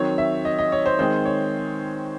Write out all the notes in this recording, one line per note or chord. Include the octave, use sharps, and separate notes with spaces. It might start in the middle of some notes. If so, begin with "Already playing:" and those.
Already playing: D#3 F#3 C4 C#5
E5
D#5
D#5
C#5
C5
D#3 G#3 C4 C5
C#5